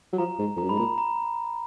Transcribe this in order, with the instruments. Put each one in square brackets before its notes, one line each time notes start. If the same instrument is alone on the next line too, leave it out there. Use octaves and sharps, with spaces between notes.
[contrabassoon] F#3
[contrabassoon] F3 [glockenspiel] A#5
[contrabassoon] G#2
[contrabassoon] F2 [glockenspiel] A#5
[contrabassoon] F#2
[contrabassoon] G#2 [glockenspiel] B5
[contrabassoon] A#2 [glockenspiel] A#5
[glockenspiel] A#5